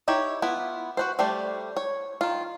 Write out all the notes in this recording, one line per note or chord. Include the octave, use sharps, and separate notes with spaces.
D#4 E4 G4 C#5
B3 E4 F4
F#4 B4 C5
G3 A3 G4 C5 D5
C#5
D#3 F4